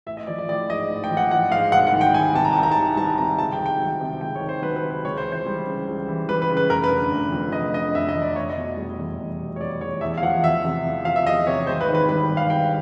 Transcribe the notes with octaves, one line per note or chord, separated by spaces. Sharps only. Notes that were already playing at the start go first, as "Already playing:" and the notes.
A1 E5
D#5
F3 D5
D5
A1 D5
G#2 D#5
A1
G5
F3
F#5
A1 F#5
G#2 F5
C2 F#5
F#5
D#3
G5
G3 G#5
C3 A5
A#5
C2 A5
A#5
A5
D#3
G3 A5
C3 A#5
C#2 A5
G5
D#3
G5
F#3
C3
C#2 G5
C#5
D#3
C5
F#3 B4
B4
C3
B4
C#2 C#5
C5
E3
C5
G3
C#3
C#2
E3
G3 B4
B4
C#3
B4
F1 A#4
B4
D3
F1
F2
F1 D#5
D3 D#5
F1 E5
D#5
F2
D5
F1 C#5
D#5
B2
G3
E2
F1
B2
C#5
G3 D5
E2 C#5
E2 E5
F5
F3 F#5
E2 E5
C3
E2
F3 F5
E5
E2 D#5
C3 C#5
G#1 C5
B4
D#3
B4
G3 B4
G2
F5
G#1 G5